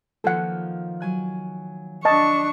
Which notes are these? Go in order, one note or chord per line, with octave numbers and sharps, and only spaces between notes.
D#3 F3 A#3 A4 F#5
F#3 G#5 F#6
D4 D#5 A5 C#6